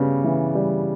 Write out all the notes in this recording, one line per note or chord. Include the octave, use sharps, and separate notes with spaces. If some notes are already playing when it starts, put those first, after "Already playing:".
Already playing: C#3 G3 B3
E3
G3